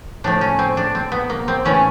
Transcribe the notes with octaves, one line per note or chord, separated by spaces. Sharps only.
A2 F3 A3 D4
C#4
C4
D4
C4
B3
A#3
C4
A2 E3 A3 C#4